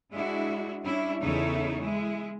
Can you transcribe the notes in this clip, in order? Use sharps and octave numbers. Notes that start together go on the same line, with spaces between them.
G#3 D4 E4 F#4
G3 C#4 D4 E4
E2 C#3 D#4 E4 A4 C#5
G#3 E4